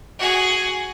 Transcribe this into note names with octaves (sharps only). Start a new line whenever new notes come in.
F#4 G#4